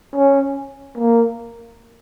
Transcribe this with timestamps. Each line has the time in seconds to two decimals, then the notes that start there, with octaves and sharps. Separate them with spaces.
0.16 C#4
0.98 A#3